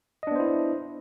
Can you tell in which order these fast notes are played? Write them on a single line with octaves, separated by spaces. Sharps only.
D#5 D4 B3 C5 E4